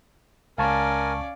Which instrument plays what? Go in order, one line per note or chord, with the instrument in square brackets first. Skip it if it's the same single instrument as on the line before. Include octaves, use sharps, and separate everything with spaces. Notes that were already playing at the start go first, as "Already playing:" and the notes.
[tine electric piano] C#2 A5 C#6 [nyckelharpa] C#4 D5 [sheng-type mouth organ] A#4 G#5 [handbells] F5